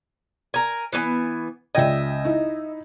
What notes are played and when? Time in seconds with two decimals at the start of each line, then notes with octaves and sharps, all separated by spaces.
0.54 A#4 G#5
0.93 E3 B3 G#5
1.75 C#2 D#5 E5 G5 G#6
2.25 D#4 E4